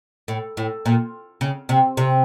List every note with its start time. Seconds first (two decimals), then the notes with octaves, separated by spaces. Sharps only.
0.28 A2
0.57 A2
0.86 A#2
1.41 C#3
1.69 C3
1.97 C3